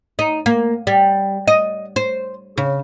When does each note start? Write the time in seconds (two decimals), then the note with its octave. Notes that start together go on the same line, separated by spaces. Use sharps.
0.19 D#4
0.46 A#3
0.87 G3
1.48 D#5
1.96 C5
2.58 C#3